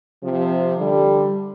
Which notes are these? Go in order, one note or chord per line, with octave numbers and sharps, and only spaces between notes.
C3 F3
D3 G3